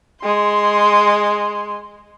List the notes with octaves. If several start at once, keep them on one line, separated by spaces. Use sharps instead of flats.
G#3 C6